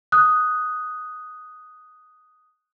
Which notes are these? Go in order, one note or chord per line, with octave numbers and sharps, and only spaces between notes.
D#6 F#6